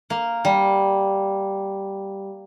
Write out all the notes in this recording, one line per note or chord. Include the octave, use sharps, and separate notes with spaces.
A#3
G3